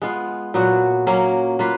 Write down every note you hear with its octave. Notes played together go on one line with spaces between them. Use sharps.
G#3 B3 F4
A#2 F#3 B3 F#4
F#3 A#3 C#4
A#3 F4 B4